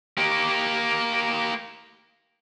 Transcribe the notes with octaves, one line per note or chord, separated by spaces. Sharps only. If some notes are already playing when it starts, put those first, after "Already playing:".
A#3 G4